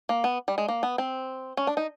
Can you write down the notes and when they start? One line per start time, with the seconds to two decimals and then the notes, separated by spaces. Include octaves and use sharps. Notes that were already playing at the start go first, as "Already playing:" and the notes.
0.09 A#3
0.24 B3
0.48 G3
0.58 G#3
0.68 A#3
0.83 B3
0.98 C4
1.57 C#4
1.67 D4
1.77 D#4